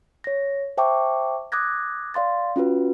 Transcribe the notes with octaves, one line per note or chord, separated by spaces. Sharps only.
C#5 A#6
C5 E5 G5 A5 C#6 D6
D6 D#6 F#6 G#6 A#6
D5 F5 C6 A6
C#4 F4 F#4 B4